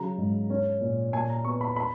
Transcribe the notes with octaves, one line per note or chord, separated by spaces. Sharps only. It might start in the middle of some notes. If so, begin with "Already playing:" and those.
Already playing: C#3 F#3 A#5
G#2
C#4
A#2
A#2 G#5
A#5
B3 C#6
B5
B5